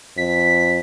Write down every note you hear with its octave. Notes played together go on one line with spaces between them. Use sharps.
F2 B6